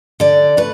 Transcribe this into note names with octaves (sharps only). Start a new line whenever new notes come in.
D3 D5
A3 B4